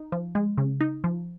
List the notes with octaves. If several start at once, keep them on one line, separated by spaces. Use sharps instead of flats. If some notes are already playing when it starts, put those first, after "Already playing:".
Already playing: D#4
F3
G#3
C#3
D#4
F3